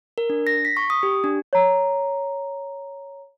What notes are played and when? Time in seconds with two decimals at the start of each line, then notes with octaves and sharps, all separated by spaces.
0.18 A#4
0.30 D4
0.47 A#6
0.65 B6
0.77 C#6
0.90 D#6
1.03 G4
1.24 D4
1.53 C#5 A#5